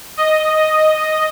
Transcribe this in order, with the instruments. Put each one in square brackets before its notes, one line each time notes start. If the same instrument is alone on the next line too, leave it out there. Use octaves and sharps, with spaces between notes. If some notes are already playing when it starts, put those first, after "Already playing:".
[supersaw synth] D#5